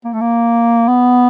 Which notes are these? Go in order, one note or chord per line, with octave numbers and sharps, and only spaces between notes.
A#3
A3
A#3
B3